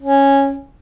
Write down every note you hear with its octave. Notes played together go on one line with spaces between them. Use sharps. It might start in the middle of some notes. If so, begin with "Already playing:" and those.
C#4